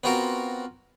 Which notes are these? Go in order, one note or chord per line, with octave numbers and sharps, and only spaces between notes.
B3 C4 F4 F#4 A#4